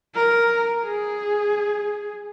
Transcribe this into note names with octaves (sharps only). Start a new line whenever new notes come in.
A#4
G#4